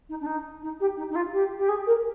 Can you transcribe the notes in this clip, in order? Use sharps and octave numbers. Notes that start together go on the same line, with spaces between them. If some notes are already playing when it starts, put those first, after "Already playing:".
D#4
D4
D#4
D#4
G4
D#4
D#4
F4
G4
G4
G#4
A#4